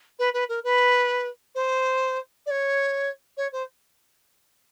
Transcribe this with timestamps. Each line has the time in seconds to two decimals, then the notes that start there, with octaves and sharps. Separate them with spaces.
0.19 B4
0.33 B4
0.49 A#4
0.64 B4
1.55 C5
2.46 D5
2.50 C#5
3.37 C#5
3.52 C5